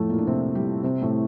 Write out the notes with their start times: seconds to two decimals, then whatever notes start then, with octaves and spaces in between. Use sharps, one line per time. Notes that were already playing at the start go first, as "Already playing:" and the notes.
Already playing: F2 A2 F3 A3
0.09 A#2 A#3
0.18 D4
0.27 C3 C4
0.55 G3 G4
0.83 C3 C4
1.02 A2 A3